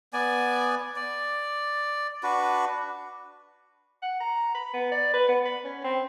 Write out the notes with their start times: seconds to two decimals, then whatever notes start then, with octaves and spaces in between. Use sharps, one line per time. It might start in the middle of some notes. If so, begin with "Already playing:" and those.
0.13 B3 D5 G#5
0.96 D5
2.23 D4 F#4 B4
4.03 F#5
4.21 A#5
4.55 B5
4.74 B3
4.92 D5
5.14 B4
5.29 B3
5.45 B5
5.65 C#4
5.84 C4